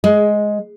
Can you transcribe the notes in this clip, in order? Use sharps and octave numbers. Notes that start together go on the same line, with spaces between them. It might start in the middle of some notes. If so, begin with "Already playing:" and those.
G#3